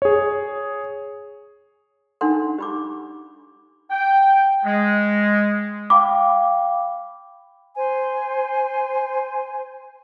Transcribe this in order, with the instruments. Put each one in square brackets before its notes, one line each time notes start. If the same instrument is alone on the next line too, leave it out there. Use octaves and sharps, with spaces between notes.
[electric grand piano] G#4 C#5
[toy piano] D4 D#4 A4 F#5 C6
G4 B5 D6
[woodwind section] G5
G#3
[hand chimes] F5 G5 B5 [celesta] D6
[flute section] C5 G#5